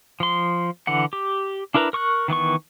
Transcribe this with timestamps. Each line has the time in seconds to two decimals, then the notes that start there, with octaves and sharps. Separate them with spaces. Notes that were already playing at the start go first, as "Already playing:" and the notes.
0.20 F3 C6
0.87 D3 E3 F#5
1.13 G4
1.74 D4 E4 A#4 B4 A#5
1.93 A#4 C#6 D6 F#6
2.28 D#3 E3 B3 C#6